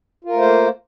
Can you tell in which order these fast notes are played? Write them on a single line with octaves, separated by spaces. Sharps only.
F4 A#4 A3 C5 A#3